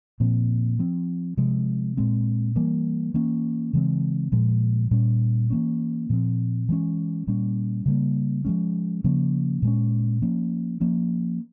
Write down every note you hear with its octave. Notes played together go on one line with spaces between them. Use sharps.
A#2 F3 C4
F3 C4
C3 F3 G#3
A#2 G#3 C4
E3 G3 A#3
E3 A#3 C#4
C#3 E3 G#3 C4
A#2 F3 G#3
A#2 G3 C#4
E3 A#3 C#4
A#2 F3 C4
E3 G#3 C#4
A#2 G3 C#4
C#3 G3 A#3
F3 G#3 C#4
C#3 F3 A#3 C#4
A#2 G#3 C#4
F3 A#3 C#4
F3 A#3 C#4